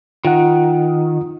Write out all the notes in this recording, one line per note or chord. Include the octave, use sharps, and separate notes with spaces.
D#3 F4 F#5